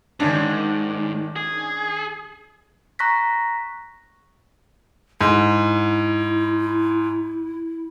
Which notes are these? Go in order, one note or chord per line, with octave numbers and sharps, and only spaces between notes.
G#2 D#3 C#4 D4
G#4
A#5 C#6 F#6 A#6 B6
G#2 E4